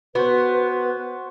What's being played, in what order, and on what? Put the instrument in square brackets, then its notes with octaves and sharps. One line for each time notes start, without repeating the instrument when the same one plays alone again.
[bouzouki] B3 [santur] F#4 C5 [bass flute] B4